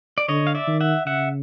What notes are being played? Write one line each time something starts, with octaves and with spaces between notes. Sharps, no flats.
D5
D3 C#5 D#5
F5
D5 E5
D#3
E5 F#5
C#3 E5 F#5